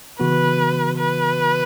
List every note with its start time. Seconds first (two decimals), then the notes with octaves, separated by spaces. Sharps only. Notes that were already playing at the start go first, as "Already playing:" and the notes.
0.20 C#3 E3 B3 F#4 B4
0.98 B4